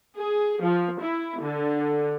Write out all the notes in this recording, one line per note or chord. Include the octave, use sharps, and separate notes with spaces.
G#4
F3
E4
D3